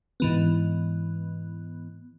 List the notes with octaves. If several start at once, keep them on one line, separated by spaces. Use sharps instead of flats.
G#2 E3 B3